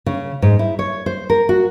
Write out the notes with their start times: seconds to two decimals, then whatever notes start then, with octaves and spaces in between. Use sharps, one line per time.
0.06 C#3
0.42 G#2
0.59 E4
0.79 C#5
1.06 C5
1.30 A#4
1.49 F#4